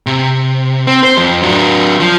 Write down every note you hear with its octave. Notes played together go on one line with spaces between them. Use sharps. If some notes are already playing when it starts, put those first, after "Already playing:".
C3
C4
C5
F2
F#3 D4
F3